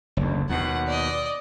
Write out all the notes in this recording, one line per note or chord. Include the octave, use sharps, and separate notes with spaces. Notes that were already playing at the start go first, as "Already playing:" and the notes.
F#1 D2
D#2 B2 F#5
D5 D#5